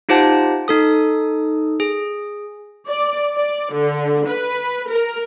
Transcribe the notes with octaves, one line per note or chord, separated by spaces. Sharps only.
D#4 F4 G4 C5 F#5 A5
D#4 A4 D#6
G#4
D5
D5
D3
B4
A#4